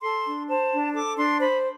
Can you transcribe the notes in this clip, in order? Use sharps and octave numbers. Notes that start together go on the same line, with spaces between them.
A4 C6
D4
C5 A5
D4
A4 D6
D4 C6
C5 B5